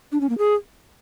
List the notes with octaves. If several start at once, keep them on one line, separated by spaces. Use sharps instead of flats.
D4
C#4
A#3
G#4